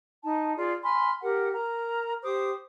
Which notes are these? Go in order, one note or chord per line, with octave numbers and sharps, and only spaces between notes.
D#4 A5
F4 G#4 D5
G#5 B5 C6 F6
G4 A#4 F#5
A#4 A#5
G4 C5 D6 D#6